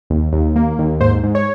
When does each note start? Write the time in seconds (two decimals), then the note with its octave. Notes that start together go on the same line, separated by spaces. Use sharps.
0.10 D#2
0.33 D#2
0.56 A#3
0.79 D#2
1.00 G#2 C5
1.24 G#2
1.35 C#5